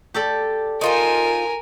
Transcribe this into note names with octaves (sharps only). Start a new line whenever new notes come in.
G4 A4 D5
D#4 F4 A#4 C5 G#5